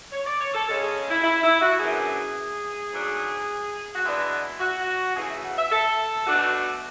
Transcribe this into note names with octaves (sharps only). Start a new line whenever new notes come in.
C#5
D5
C#5
A4
C#3 G#3 C#4 A4
G#4
E4
E4
E4
F#4
F#2 E3 B3 D4 G#4
G#2 F#3 A3 D4
F#4
B2 G#3 B3 D4 E4
F#4
C#3 E3 A3 G#4
E5
F#5
E5
A4
B2 A3 D4 F#4